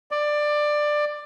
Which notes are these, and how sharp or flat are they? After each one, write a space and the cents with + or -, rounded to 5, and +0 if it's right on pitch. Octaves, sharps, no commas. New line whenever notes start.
D5 +15